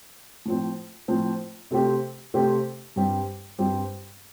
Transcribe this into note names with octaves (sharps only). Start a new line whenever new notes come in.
A2 F3 C4
A2 F3 C4
C3 A3 C4 G4
C3 A3 C4 G4
G2 G3 C4 G4
G2 G3 C4 G4